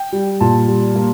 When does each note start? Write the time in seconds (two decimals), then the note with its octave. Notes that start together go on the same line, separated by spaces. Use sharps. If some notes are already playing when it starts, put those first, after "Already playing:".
Already playing: G5
0.12 G3
0.40 A#2 A5
0.68 G3
0.95 A#3